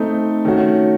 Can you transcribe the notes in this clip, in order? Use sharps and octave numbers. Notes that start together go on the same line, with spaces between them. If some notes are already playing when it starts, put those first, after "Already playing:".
Already playing: A3 C4 D#4
D#3 A3 C#4 F#4